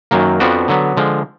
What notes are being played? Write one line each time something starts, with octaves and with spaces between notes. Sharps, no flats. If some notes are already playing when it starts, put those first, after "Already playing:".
F#2 D#3 F#3 A#3
F2 F3 B3 D4 F#4
D3 F#3 B3
D3 F3 G#3